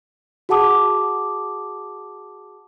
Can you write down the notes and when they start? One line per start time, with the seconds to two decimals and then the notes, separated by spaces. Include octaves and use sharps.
0.49 F#4 G#4 F#5 A5 D6 D#6